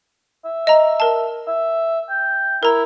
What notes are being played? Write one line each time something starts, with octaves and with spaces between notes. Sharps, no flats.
E5
D#5 A#5
A#4 A5
E5
G5
E4 A#4 A#5